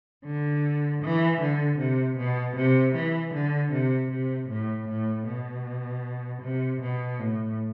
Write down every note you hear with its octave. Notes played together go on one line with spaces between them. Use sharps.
D3
E3
D3
C3
B2
C3
E3
D3
C3
C3
A2
A2
B2
C3
B2
A2